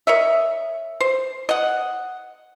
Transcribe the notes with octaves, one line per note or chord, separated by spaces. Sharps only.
A#4 C#5 D#5 E5
C5
D#5 F#5